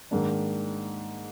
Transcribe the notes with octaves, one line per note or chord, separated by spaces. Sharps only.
G#2 D#3 A#3 D4